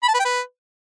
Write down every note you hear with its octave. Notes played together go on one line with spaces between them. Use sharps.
B5
A5
B4
G5
B4